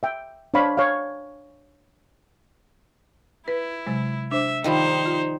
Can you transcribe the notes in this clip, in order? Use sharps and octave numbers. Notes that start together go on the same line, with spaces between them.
E5 G5
D4 C5 C#5 F5 B5
C#5 F5
E4 B4
C3 F#3 G#3
D4 C5 E5 D6
D#3 F3 G3 D#4 C5 D#5 B5
F4